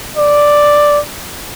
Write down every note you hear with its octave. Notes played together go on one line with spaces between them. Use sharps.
D5